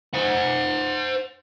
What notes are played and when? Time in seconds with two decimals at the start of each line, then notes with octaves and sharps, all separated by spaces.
0.14 C5 F#5